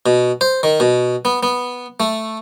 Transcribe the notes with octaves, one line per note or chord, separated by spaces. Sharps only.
B2
C5
D#3
B2
B3
B3
A3